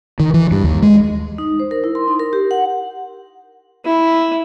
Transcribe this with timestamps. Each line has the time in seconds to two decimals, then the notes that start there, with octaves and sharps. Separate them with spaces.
0.20 D#3
0.34 E3
0.51 G2
0.64 D#2
0.82 G#3
1.38 D#4
1.60 C5
1.71 A#4
1.84 E4
1.95 C6
2.08 D#4
2.19 A#4
2.33 G4
2.51 F#5
3.85 E4